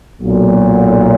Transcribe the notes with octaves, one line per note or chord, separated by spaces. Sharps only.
B1 A#2 F#3